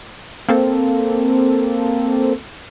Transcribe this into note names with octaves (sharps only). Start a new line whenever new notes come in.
A#3 C4 A4